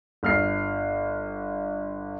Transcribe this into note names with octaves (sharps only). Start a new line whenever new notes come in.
G1 F6 C7